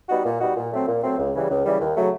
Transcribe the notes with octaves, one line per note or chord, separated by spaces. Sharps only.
G3 B3 D#4 F#4
A#2
G3 B3 D#4 F#4
A#2
F#3 A3 C4
A#2
F#3 A3 C4
C#2
C#3 E3 G3
C#2
C#3 E3 G3
D#2
C#3 F#3 A3